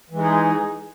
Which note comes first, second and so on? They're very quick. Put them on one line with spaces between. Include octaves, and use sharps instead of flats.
E3 G#3 D#4 G#4